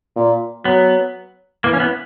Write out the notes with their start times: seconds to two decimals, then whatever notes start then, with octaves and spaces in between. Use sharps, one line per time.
0.16 A#2
0.65 F#3 B3
1.64 E3 A#3
1.73 C#4
1.80 B3